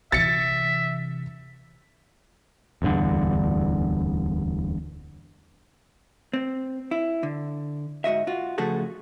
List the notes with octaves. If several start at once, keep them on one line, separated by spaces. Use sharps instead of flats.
C3 E3 E5 A6 C#7
D1 E2 G2 D3
C4
E4
D3
G#2 F#4 D#5 E5
F4 F#4
C#3 F3 A3 F#4 G#4 A4